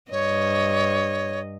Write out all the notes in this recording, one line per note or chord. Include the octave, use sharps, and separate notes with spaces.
G2 C#5 D#5